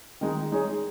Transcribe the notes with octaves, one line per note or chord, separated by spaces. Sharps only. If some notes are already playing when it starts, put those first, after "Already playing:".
D#3 G#3 D#4
G#3 D#4 G#4 C#5